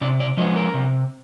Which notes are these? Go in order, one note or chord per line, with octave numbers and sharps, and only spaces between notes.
C3 D5
D5
F3 G#3 B3 D#5
A#4
C3